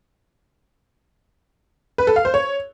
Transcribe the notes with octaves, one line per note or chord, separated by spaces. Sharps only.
B4
A4
F5
C5
C#5